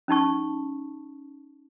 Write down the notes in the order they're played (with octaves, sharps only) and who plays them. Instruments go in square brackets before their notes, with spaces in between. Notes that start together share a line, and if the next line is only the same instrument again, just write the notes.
[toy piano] C#4 D#4 A5 C#6